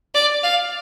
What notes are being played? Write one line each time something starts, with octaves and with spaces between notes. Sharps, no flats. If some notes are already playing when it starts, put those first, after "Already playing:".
D5
F5